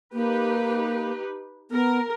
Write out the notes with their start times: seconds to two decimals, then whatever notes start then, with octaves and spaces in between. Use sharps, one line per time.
0.13 A#3 D#4 G4 B4
1.71 B3 A#4